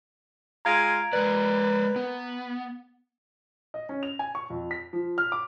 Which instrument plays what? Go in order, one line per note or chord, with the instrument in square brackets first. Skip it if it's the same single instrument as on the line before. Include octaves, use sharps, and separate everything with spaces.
[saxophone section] G#3 F4 F5 [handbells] A#5 G#6 D7
[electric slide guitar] G#3 D5 [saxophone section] A#3 B4
[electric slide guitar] B3
[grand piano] D#5
C#4
F7
G#5
C#6
F2
B6
F3
F6
D6